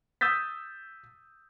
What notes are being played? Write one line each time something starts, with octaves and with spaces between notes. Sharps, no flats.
D#6 E6 G6 A6 B6